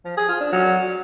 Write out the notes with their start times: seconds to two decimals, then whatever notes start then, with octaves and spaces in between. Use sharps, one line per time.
0.05 F3
0.17 G#4
0.29 F4
0.41 D4
0.52 F#3